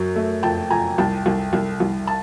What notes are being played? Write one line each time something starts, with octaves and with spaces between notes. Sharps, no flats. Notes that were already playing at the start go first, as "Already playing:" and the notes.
Already playing: F#2 F#3
A3
F2 G5 A5
F2 G#5 A#5
C2 G5 A5
C2
C2
C2
A5